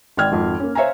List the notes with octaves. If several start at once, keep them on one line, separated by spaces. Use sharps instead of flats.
G#1 D5 G5 F6 G#6
G#1 F2
A#3 C#4
C5 C#5 E5 F5 G#5 A#5